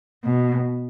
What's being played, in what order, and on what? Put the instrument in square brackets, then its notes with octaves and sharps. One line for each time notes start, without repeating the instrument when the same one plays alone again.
[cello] B2